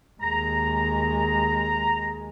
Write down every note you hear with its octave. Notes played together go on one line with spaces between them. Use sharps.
D#2 G#3 A#5